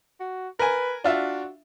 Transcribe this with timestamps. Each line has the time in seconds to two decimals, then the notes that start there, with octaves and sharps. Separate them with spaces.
0.20 F#4
0.59 A#4 B4 G#5
1.04 D4 F4 F#4 E5